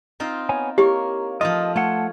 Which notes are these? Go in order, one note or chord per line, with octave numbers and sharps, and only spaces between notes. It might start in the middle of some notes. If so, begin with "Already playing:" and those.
C4 D#4 F4
B3 C#5 G#5
A#3 E4 G4 C#5
F3 A3 F4 D#5
A3 A4 C#5 F#5